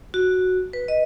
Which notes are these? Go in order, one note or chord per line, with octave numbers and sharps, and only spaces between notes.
F#4
B4
D#5